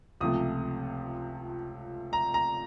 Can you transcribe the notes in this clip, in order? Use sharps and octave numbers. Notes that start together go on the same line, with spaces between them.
C#2 C3 F3 A3 D#6
A#5
A#5